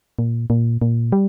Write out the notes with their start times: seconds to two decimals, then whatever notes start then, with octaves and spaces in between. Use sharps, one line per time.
0.19 A#2
0.50 A#2
0.82 A#2
1.12 G3